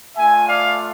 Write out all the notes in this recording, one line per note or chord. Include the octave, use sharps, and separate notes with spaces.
A3 D4 F4 E5 G#5
D5 F5